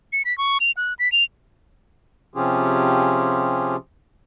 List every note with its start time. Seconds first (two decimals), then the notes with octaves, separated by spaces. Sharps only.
0.13 C#7
0.25 B6
0.38 C#6
0.60 F7
0.77 F#6
0.99 B6
1.12 F7
2.34 C3 F3 C#4 F4 G4 G#4